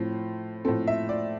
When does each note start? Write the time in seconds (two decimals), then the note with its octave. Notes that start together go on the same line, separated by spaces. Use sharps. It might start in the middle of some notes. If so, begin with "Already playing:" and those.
Already playing: A2 F3 C4
0.65 A2 F3 C4 A4
0.87 E5
1.09 D5